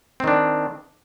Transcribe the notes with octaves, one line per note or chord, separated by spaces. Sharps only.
D#3 C4 D4